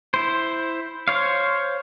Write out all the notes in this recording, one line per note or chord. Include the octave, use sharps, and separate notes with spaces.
E4 C5
C5 C#5 F5